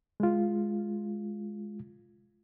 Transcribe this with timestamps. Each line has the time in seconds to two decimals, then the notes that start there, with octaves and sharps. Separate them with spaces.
0.20 G#3 F4